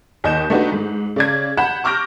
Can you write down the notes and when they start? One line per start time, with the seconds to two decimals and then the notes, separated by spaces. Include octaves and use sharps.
0.24 D#2 D#5 G6 E7
0.50 A3 D4 D#4 F#4 G4 B4
0.72 G#2
1.16 C#3 D5 G#6
1.57 F#5 B5 G6 E7
1.84 C#6 D6 F6 G6 A#6 D7